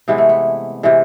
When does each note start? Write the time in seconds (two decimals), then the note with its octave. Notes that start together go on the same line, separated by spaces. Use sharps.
0.08 C3 E3 G#3 B3
0.18 A3
0.29 B3
0.83 C3 E3 G#3